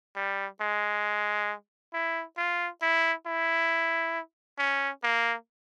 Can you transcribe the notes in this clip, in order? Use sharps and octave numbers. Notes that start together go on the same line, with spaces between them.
G3
G#3
E4
F4
E4
E4
C#4
A#3